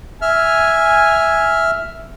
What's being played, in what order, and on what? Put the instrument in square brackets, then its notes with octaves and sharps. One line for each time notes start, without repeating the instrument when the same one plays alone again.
[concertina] E5 F6 [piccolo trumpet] G#5